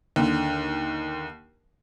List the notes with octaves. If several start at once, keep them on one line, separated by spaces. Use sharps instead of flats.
D#2 D3